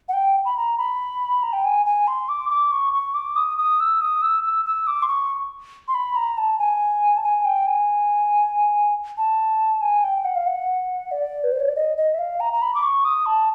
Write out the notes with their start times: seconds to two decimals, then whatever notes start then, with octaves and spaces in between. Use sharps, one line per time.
0.09 F#5
0.13 G5
0.45 B5
0.57 A#5
0.78 B5
1.43 A#5
1.53 G5
1.65 G#5
1.86 G#5
2.07 C6
2.29 D6
2.50 D6
2.71 C#6
2.93 C#6
3.14 D6
3.36 D#6
3.58 D#6
3.80 E6
4.01 D#6
4.22 E6
4.45 E6
4.65 E6
4.87 D6
5.03 C6
5.08 C#6
5.88 C6
5.95 B5
6.16 A#5
6.38 A5
6.59 G#5
7.17 A5
7.24 G#5
7.45 G5
7.67 G#5
9.18 A5
9.82 G#5
10.04 G5
10.24 F#5
10.36 F5
10.47 F#5
11.11 D5
11.44 B4
11.52 C5
11.60 C#5
11.68 D5
11.76 D#5
11.97 D#5
12.14 E5
12.19 F5
12.40 A#5
12.53 A#5
12.62 B5
12.75 D6
12.83 C#6
13.05 D#6
13.26 A5